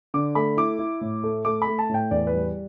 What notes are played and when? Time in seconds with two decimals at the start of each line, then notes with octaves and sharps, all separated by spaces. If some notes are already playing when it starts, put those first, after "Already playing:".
0.14 D3 D6
0.35 A3 B5
0.57 E4 D6
0.79 E4
1.01 A2
1.24 A3
1.45 A3 D6
1.62 B5
1.67 A3
1.78 A5
1.89 A2 G5
2.11 E2 D5
2.27 B4
2.33 G3